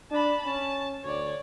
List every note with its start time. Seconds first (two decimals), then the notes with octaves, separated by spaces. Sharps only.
0.12 D4 A5 B5
0.46 C#4 A5
1.04 D2 C#5 D5